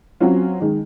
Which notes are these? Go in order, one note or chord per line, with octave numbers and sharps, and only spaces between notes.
F#3 C4 C#4 F4
D#3 G#3